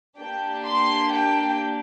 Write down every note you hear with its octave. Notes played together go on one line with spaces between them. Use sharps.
A#3 D4 G4 G5
C6
G5